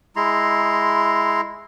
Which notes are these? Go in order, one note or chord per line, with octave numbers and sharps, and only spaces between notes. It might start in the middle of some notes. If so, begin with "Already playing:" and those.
G#3 E4 A#5 C6